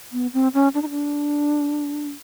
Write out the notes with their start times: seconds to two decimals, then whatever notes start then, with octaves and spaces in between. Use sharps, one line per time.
0.12 B3
0.33 C4
0.54 C#4
0.74 D4
0.82 D#4
0.90 D4